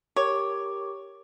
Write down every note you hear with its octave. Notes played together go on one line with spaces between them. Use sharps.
G4 A#4 C#5 D6